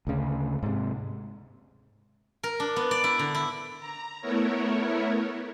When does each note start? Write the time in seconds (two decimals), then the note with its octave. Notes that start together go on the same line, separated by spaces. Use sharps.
0.07 D2 C#3
0.63 G#2 C3
2.43 A#4
2.60 D4
2.76 B3
2.91 D5
3.04 E4
3.19 D3
3.35 E4
3.79 A#5
4.21 A3 B3 E4 A#4 C#5